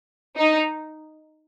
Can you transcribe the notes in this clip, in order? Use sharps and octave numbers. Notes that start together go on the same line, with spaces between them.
D#4